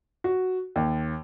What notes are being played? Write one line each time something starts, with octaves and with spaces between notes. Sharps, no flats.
F#4
D#2